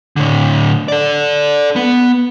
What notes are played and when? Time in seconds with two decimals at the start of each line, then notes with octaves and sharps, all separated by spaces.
0.17 A2 D3
0.88 A4 D5
1.76 B3